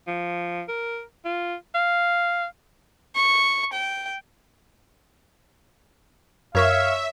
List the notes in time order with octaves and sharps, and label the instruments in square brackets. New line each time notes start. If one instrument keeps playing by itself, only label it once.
[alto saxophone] F3
A#4
F4
F5
[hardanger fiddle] C#6
G5
[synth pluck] F#2 A#4 C#6 [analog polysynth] C#5 [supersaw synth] E5 [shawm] F5